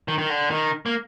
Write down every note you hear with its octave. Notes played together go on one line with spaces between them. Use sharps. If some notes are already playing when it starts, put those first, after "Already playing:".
D#3
D#3
D3
D#3
A#3